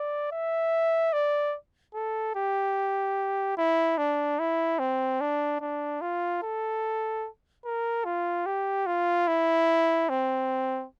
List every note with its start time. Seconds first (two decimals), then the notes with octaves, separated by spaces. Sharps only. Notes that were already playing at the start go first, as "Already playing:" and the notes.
Already playing: D5
0.31 E5
1.13 D5
1.94 A4
2.35 G4
3.57 E4
3.98 D4
4.39 E4
4.79 C4
5.21 D4
5.61 D4
6.01 F4
6.43 A4
7.65 A#4
8.05 F4
8.46 G4
8.86 F4
9.28 E4
10.09 C4